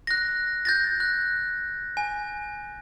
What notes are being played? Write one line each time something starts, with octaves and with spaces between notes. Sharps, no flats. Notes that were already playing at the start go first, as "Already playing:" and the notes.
F#6 A#6
G6 A6 A#6
F#6
G#5